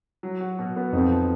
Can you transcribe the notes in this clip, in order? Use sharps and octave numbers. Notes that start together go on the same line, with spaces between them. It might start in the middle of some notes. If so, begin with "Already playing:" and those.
F#3
F#4
B2
B3
F2 D#4
F3